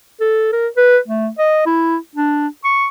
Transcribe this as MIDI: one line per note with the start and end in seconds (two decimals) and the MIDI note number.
0.21 0.49 69
0.53 0.68 70
0.77 0.98 71
1.08 1.29 57
1.39 1.66 75
1.66 1.96 64
2.16 2.47 62
2.64 2.88 85